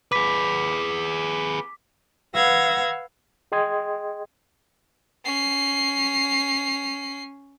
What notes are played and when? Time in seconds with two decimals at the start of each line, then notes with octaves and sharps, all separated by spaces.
0.12 G#4 B4 D6 B6
2.34 B4 F5 F#5 E6 G#6 A#6
3.52 G#4 D#5 G5 C6 D#6 G#6
5.25 C#4 C7